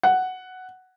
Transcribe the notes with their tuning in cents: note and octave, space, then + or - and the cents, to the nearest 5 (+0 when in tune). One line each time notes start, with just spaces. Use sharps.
F#5 +5